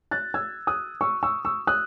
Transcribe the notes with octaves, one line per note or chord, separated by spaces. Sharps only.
F#6 A6
E6 G#6
D#6 F#6
C#6 E6
C#6 E6
C#6 E6
D#6 F#6